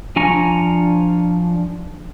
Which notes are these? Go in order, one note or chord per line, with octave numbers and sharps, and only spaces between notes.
F3 D4 G#5 A#5 C#6